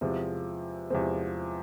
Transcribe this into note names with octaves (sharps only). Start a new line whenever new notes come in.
E2 C3 F3 G#3 C4
E2 C3 F3 G#3 C4